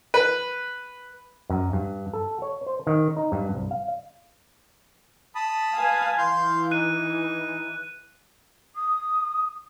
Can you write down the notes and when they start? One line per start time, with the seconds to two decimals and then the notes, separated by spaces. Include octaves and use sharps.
0.14 B4
1.50 F#2
1.73 G2
2.13 A4
2.42 C#5
2.66 C5
2.87 D#3
3.17 D#4
3.32 G2
3.54 C2
3.71 F5
5.35 A5 B5 D#6
5.76 B4 F5 G#5
6.18 E3 F5 C6 G6
6.71 D#4 F#6 D#7
8.76 D#6